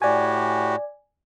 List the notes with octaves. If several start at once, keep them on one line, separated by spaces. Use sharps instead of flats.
A2 F#4 G4 D5 G#5